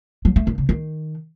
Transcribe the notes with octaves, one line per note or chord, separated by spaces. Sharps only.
F#3
A3
D#3
C#3
D#3